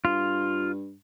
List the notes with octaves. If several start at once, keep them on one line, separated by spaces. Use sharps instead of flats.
G2 F4